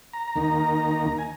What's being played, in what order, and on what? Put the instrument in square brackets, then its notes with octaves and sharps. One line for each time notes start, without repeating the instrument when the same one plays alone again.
[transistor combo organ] A#5
D#2 D#3 A#3 D#4
G#5